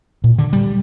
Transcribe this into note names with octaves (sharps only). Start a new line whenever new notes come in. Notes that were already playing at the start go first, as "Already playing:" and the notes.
A#2
D3
G3